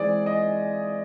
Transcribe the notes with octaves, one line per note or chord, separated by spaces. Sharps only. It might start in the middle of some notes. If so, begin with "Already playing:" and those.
Already playing: E3 G#3 C4 G#4 D5
D#5